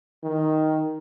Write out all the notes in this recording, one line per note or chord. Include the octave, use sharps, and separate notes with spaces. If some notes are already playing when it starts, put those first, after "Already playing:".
D#3